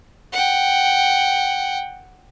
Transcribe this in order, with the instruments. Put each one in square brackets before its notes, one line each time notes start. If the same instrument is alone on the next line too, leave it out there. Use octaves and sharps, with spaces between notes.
[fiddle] F#5 G5